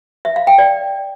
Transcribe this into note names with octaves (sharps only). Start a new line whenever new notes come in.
E5
F5
G5
D5